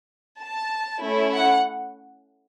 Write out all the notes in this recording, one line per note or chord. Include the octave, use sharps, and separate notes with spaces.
A5
A3 C#4 E4
F#5